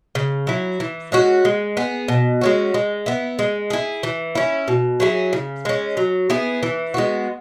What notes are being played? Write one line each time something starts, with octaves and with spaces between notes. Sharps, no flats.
C#3
F#3 E4
E3
G#3 C#4 F#4
G#3
B3 G#4
B2
G#3 C#4 F#4
G#3
B3 E4
G#3
E4 G#4
E3
C#4 E4
B2
F#3 E4 G#4
C#3
G#3 C#4
F#3
B3 E4 G#4
E3
G#3 B3 F#4